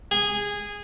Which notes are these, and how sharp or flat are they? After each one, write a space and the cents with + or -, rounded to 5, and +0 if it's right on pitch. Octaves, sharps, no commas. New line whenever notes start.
G#4 -15